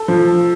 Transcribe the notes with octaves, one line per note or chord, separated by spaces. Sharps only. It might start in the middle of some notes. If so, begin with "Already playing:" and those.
Already playing: A4
F3